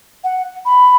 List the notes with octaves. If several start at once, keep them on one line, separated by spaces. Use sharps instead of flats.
F#5
B5